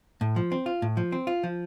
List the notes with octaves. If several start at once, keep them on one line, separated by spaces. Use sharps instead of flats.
A2
F3
C4
F4
A2
F3
C4
F4
F3